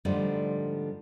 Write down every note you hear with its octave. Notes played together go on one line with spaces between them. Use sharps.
G#2 D3 F3 G3 A3